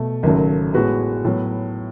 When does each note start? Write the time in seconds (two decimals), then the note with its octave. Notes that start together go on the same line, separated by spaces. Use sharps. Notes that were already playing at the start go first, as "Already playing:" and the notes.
Already playing: B2 A3
0.23 G#1 F#2 C#3 F#3 A3
0.74 A2 G#3 B3 F#4 B4
1.25 A2 F#3 B3